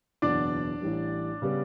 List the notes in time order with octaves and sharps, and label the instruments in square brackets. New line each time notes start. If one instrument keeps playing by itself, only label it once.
[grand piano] F#1 E2 B2 [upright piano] D4 D5
[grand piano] A1 A2 E3 G3
C#3 G3 B3